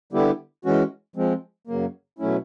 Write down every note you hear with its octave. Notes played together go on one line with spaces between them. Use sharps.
D3 G3 B3 E4 G4
E3 G#3 C#4 F#4
F3 G#3 C4
F#2 C#3 F#3 A#3
B2 F#3 A3 C#4 E4